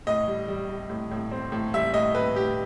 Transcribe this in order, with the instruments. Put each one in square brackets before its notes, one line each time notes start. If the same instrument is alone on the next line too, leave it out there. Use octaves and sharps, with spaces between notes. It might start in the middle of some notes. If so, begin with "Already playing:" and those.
[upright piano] A2 D#5
G3
G3
G3
A2
A2
C4
A2
G3 E5
A2 D#5
A2 B4
A2 G4